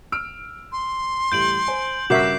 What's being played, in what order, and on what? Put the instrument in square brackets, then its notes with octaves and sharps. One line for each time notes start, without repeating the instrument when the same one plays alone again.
[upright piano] E6 F6 D7
[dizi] C6
[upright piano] A1 G3 [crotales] G6 D7 F#7
[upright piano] C5 G#5
[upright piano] G2 C#3 [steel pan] F#4 A#4 E5 [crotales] D6 G6 C7